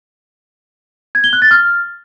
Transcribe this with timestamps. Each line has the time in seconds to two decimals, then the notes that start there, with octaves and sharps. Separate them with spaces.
1.15 G#6
1.24 G7
1.33 F#6
1.42 A6
1.51 F6